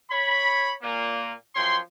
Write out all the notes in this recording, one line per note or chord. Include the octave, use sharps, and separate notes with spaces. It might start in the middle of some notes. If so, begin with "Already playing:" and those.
C#5 B5
A#2 A#3
F#2 F3 C#5 G5 C6